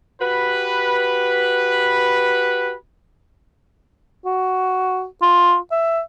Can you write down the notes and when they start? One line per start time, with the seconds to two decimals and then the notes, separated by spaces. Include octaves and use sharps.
0.21 F#4 G4 B4
4.26 F#4
5.22 F4
5.72 E5